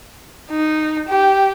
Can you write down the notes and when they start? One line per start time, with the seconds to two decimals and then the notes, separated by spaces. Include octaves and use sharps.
0.50 D#4
1.08 G4